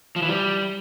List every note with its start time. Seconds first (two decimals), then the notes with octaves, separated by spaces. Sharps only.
0.16 F3
0.22 E3
0.28 G3